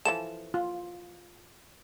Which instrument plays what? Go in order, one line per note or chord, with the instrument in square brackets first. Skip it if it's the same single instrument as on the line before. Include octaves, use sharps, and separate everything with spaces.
[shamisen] E3 F3 A4 [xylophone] E7
[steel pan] F4